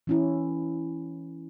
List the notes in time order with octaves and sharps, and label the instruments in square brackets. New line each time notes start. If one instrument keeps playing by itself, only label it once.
[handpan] E3 C#4 E4